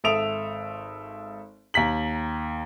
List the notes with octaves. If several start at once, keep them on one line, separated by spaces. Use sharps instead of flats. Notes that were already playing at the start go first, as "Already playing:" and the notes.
G#1 A4 E5 D#6 D7 F7
D#2 A#5 B6 F#7